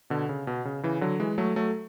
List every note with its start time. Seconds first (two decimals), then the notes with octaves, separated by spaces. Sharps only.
0.10 B2 D3
0.29 C#3
0.47 B2
0.65 C#3
0.83 C#3 E3
1.01 D3 F#3
1.20 E3 G#3
1.38 F#3 A3
1.56 F#3 A3